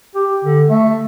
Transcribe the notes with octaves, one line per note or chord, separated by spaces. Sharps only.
G4
D3
A3